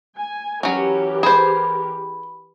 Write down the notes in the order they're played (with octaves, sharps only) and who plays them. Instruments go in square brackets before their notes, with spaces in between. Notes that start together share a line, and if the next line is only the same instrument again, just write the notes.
[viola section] G#5
[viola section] E3 G4 A#4 [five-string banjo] F#3 C#4
[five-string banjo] G#4 C5 [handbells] B5